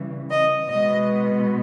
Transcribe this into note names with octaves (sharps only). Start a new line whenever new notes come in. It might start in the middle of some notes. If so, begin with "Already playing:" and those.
Already playing: C#3 E3 G3
D#5
B2 G#3 B3 D#5